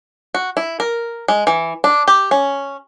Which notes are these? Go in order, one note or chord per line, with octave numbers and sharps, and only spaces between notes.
F#4
E4
A#4
G#3
E3
D4
G4
C#4